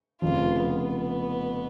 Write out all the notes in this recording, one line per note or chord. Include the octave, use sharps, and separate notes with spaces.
F1 F2 C#3 F3 F4
B3